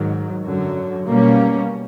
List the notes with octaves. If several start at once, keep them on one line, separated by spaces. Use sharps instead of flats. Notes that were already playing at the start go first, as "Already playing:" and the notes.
Already playing: G#2 D#3 F#3
F#2 D3 F#3
B2 G3 A#3 C#4